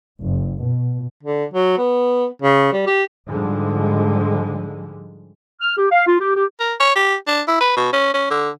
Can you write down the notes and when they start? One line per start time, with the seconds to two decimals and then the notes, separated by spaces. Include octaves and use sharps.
0.19 F#1
0.60 B2
1.23 D3
1.54 F#3
1.78 B3
2.42 C#3
2.73 G3
2.87 G4
3.28 G#2 D3 F3 G3 G#3
5.60 F6
5.78 G4
5.91 F5
6.07 F4
6.20 G4
6.36 G4
6.60 A#4
6.80 C#5
6.96 G4
7.27 D4
7.48 E4
7.60 B4
7.77 B2
7.93 C#4
8.14 C#4
8.30 D3